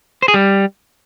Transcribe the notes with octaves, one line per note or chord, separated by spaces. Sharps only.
C5
G#4
G3